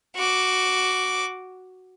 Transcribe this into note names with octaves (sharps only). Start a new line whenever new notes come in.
F#4 D6